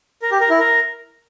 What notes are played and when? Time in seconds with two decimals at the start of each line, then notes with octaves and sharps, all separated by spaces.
0.22 A#4
0.31 G4
0.41 A#4
0.50 E4
0.59 A#4